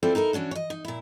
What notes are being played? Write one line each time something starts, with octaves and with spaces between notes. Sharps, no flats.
C4 E4 F4 A4 C5 D5
D#4 E4 A4 A#4
E3 C#4 D4 F#4
C#5 D#5
D#4
A#2 E4